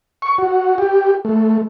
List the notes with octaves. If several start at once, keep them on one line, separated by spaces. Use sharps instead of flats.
C#6
F#4
G4
A3